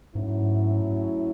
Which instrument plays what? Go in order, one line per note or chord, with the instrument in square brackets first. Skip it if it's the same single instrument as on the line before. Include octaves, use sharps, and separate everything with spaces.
[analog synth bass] G#2 [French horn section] F#3 A3 C#4 E4